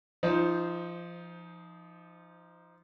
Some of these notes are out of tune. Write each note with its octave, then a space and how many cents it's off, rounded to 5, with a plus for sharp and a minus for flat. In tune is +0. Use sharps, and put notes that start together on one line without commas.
F3 -20 D#4 +10 C5 +0